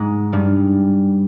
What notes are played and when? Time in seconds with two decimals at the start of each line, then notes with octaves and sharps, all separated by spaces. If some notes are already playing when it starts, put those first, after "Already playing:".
Already playing: G#2 G#3
0.32 G2 G3